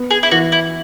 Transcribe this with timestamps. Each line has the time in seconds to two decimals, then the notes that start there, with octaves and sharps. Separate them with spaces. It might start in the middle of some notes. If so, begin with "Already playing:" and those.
Already playing: B3
0.10 G#4
0.23 E4
0.31 E3 F#4
0.52 E4